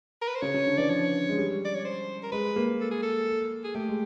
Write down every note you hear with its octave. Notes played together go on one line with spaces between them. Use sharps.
A#4
B4
C5
C#3 C#5
C#3
D3
E3 D5
F3 C#5
G#3
G3
D5
C#5
C5
A#4
G#3 B4
A#3
A4
G#4
A4
G#4
A3 G4
G#3